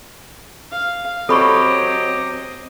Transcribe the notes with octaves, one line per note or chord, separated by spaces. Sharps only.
F5
F#3 C4 C#4 G4 A4 D#5 B5 C#6